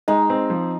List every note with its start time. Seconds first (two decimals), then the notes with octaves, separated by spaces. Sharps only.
0.08 G#3 D#4
0.30 C4
0.50 F3